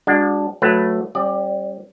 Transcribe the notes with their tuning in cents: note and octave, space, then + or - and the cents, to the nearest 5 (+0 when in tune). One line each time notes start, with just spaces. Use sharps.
G#3 -35 D4 +0 F#4 -20
F#3 -20 A3 +0 B4 +0
G3 -5 C#4 -30 D5 +20